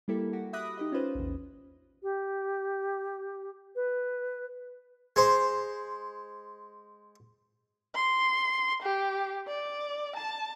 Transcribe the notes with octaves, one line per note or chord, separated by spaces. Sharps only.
G3 A#3 E4 G4 A4
F#4 G4
E5 B5 D6 D#6 F#6 A#6
D#4 G4 D#5
C#4 F4 B4 C5
A#1 E2
G4
B4
G#3 C5
C6
G4
D5
A5